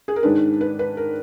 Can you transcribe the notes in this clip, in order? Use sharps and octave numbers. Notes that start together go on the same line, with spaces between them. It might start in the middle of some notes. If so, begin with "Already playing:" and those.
G#4
A#4
G#2 D#3 G#3 D4 B4
B4
B4
A#4